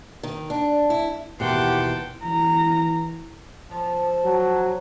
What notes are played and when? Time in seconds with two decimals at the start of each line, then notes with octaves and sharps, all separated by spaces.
0.23 D#3
0.50 D4
0.90 E4
1.40 D#2 B2 E3 G4 F#5 G5 A5 C6
2.24 E3 A#5
3.71 F3 A5
4.25 F#3